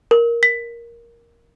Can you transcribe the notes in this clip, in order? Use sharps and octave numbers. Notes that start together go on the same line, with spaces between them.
A#4
B6